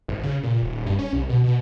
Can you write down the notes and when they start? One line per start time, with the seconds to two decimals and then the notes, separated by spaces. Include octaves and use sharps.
0.08 G#1
0.24 C#3
0.43 A#2
0.62 D#1
0.86 G2
0.99 C#4
1.13 C2
1.29 B2
1.44 B2